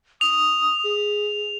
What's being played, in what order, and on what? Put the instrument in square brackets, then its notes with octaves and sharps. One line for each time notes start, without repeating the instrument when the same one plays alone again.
[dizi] D#6 [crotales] F7
[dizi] G#4